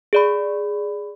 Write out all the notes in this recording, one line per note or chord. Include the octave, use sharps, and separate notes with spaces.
G#4 D5 B5